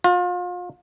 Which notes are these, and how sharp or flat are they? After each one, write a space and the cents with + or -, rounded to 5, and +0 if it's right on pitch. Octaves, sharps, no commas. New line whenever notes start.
F4 +35